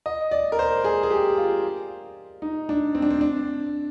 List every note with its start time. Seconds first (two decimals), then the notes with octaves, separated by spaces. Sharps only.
0.06 D#5
0.31 D5
0.52 A#4
0.59 C5
0.84 G#4
1.03 G#4
1.10 G4
1.38 F4
2.42 D#4
2.69 D4
2.95 C4
3.02 D4
3.10 C4
3.21 D4